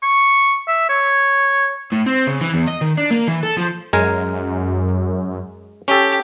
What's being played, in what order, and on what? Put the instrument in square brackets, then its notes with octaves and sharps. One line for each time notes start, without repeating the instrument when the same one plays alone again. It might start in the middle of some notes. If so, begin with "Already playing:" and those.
[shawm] C#6
E5
C#5
[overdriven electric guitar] A2
C4
C#3
E3
E2
D#5
D#3
D4
A#3
E3
A4
F3
[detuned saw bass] F#2 [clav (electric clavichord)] G#3 A#4 G#5
[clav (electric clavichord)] C#4 A4 [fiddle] G4